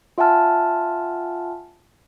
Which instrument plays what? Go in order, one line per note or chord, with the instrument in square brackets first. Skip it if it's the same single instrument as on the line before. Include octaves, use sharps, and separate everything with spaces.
[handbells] F4 E5 F#5 G#5 A5 F6